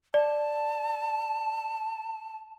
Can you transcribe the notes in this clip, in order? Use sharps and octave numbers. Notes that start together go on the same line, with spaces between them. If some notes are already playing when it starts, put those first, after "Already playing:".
D5 A5